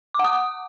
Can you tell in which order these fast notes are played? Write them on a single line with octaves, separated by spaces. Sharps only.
D6 F#5 D#6